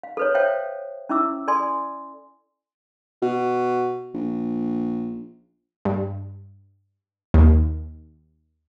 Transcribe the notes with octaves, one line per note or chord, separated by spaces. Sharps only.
F5
A4 B4 C#5
A4 C5 C#5 E5 F5 G5
C#4 E4 E5 D6 E6
A4 D5 G#5 C6
B2
A#1
G2
D#2